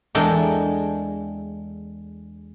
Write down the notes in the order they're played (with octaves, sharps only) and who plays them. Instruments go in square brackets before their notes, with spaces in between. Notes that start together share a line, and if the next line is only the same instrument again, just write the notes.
[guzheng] E2 G#3 D4 A4 A#4 G5